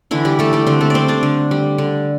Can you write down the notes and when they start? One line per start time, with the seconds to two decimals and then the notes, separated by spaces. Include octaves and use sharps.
0.11 D3 E3 E4
0.25 G3 G4
0.39 G3 A3 A4
0.53 G3 G4
0.67 D3 C4 C5
0.81 A3 A4
0.90 G3 C4 C5 D5
1.08 D4 D5
1.23 D3
1.51 G3
1.78 D3